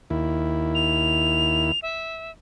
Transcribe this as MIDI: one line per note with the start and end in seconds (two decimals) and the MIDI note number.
0.10 1.72 39
0.10 1.72 64
0.75 1.80 101
1.82 2.31 76